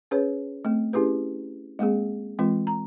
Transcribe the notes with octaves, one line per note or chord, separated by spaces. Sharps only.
C#4 G#4 B4 C#5
A3 C4
C#4 E4 G4 G#4 B4
G#3 A#3 C4 G#4
E3 G#3 C4 F4
A#5